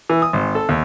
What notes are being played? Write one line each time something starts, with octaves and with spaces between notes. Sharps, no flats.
E3
D#6
G#1
A4
D#2